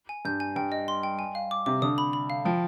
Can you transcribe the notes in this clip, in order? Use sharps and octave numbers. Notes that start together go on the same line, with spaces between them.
G#5
G2 G6
G#5
G2 G5
D#5
C6
G5
G#5
F5
D6
C3 D6
D3 D#6
B5
B5
F5
F3 G5